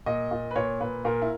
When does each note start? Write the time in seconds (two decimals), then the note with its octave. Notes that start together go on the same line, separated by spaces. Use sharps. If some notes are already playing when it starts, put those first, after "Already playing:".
0.06 A#2 D#5
0.31 A#2
0.51 B4
0.56 A#2 C#5
0.81 A#2 B4
1.05 A#2 A#4
1.22 E4